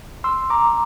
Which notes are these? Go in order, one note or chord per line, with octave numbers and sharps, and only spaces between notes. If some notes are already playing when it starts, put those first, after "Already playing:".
C2 C6 E6
A#5 D6